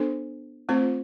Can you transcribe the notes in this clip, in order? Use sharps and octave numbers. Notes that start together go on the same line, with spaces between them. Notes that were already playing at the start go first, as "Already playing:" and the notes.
Already playing: B3 D4 A4 C5
A3 C4 F4 C5